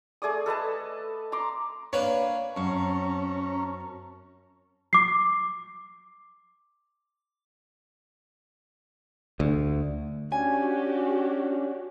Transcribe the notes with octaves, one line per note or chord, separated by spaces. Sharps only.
A3 G#4 D5 D#6
A4 B4 D#5 A5
A#5 C6 D6
A#3 D4 B4 C#5
F#2 C4 C#4 A5 A#5
D6 C7
D2
C#4 D4 F#4 G4 G#5